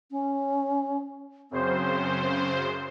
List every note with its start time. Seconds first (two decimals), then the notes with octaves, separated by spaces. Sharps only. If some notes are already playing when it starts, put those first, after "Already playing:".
0.11 C#4
1.51 F#2 C#3 C4 C5